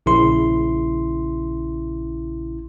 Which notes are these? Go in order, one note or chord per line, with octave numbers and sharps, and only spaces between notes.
A#1 C#3 E4 C6